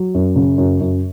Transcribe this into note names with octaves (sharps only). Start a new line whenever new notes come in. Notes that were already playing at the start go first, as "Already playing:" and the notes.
Already playing: F#3
F#2
C#3
F#2
F#2